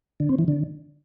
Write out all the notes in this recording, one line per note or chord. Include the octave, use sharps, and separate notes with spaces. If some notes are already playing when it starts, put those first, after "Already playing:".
D3
C4
E3
D3